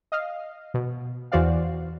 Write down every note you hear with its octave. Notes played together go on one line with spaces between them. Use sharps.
D#5 F5
B2
E2 E3 F#4 C5 D5 F5